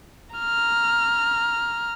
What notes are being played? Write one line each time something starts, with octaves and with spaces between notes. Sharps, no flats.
A#5 F6